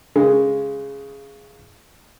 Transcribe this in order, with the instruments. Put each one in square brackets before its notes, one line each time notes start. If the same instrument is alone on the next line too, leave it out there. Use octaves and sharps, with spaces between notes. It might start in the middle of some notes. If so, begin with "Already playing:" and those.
[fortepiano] C#3 G#3